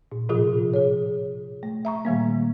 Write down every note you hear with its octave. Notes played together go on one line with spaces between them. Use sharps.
A#2
A2 C3 F3 F4 G#4
G#4 C#5
A3
E5 A#5 C#6
A#2 D#3 G3 A#3